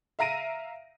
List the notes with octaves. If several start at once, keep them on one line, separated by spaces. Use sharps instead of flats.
E5 F5 A#5 A#6 D7 D#7